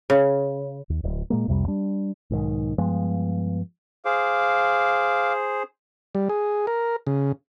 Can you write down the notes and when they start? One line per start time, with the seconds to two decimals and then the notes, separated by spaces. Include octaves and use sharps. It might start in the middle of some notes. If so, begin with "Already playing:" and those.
0.10 C#3
0.90 D#2
1.03 D1
1.30 A#2 G#3 A#3
1.48 C2 F2 C3 G3
1.68 G3 D4
2.31 B1 G#2 D#3
2.78 G2 F3 G#3 B3
4.05 G#4 C5 F5 D6
6.15 G3
6.29 G#4
6.67 A#4
7.07 C#3